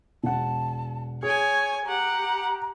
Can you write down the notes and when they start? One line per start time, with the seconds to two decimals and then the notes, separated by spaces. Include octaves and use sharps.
0.24 E1 F#5 A5
1.23 G#4 C#5 G#5 G#6
1.85 G4 F#5 A#5